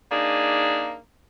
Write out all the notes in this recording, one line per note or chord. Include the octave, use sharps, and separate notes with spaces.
A#3 D4 D#4 G#4